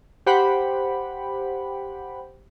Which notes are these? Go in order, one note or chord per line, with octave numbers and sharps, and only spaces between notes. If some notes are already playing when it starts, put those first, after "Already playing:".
G4 C5 F#5 G5 B5